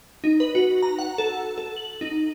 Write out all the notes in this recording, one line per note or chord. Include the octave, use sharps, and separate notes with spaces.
D#4
B4
F#4
A#5
F#5
A4
A4
F#7
D#4